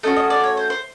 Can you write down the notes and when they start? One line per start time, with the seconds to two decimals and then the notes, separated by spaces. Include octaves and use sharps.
0.03 A3 C#4 F#4 D#5
0.16 D#5
0.30 D5
0.44 C#5
0.57 C5
0.70 C5